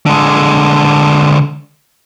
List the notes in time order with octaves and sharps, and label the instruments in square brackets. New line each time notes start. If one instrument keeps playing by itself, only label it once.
[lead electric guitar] D3 G#3